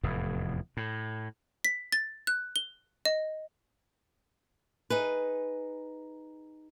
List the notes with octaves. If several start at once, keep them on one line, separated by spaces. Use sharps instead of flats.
F1 E2 A2
A2
B6
A6
F#6
G7
D#5
D#4 G#4 B4